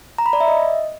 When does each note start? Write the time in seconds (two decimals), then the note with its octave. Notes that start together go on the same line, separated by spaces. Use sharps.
0.18 A#5
0.26 B5
0.33 D5
0.40 E5
0.48 D#5